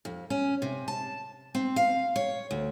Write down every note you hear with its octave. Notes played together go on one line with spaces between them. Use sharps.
F2
C#4
C3
A5
C4
F5
C#5
D2